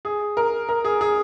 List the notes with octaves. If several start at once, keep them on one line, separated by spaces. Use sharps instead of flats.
G#4
A#4
A#4
G#4
G#4